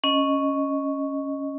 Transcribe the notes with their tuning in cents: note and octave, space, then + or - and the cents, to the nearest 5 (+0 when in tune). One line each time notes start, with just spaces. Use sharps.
C#4 +0 D#5 +0